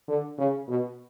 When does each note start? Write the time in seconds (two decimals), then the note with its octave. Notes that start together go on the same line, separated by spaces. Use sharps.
0.08 D3
0.38 C#3
0.68 B2